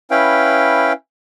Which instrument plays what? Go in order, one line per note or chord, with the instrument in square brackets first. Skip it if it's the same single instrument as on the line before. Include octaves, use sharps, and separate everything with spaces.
[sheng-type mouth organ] C#4 E4 B4 F5 G5